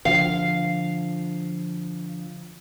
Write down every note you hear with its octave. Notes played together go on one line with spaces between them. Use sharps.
D3 F3 F5